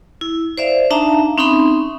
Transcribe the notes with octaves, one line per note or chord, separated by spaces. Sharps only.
E4
C5 D5 E5 F5
D4 D#4 E5 F5 A5 A#5
C4 C#4 D#4 E5 B5 C6